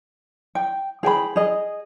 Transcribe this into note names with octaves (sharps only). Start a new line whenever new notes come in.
G5
G#4 G5 G#5 B5
G#4 D#5